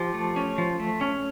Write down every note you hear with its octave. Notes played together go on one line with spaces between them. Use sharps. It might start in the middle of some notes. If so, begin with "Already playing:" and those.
Already playing: F3 G4
A3
C#4
F3
A3
C#4